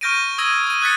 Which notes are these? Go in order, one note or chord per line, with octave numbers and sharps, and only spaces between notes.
C#6 F6 G6 A#6 D7 D#7
D#6 E6 G#6 A#6 D#7
D#6 D#7
D#6 F#6 G#6 A6 B6 C#7